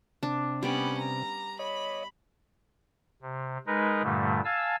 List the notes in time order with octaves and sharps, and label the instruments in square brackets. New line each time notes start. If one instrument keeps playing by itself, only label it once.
[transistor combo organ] C3 [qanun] D4
[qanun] G3 B3 D5 [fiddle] C#4 B5
[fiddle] A#5
[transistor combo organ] C#5 D#5 [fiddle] B5
[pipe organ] C3
G#3 D#4 A#4 B4
G2 A#2 D3 G3 A3
F5 G#5 A5 E6